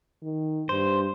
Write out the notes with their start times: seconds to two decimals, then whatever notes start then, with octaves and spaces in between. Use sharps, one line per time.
0.23 D#3
0.69 G2 C5